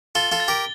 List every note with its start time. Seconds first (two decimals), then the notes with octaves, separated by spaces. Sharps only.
0.15 F4 A4 G7
0.32 F4 A4
0.40 A6
0.48 G4 A#4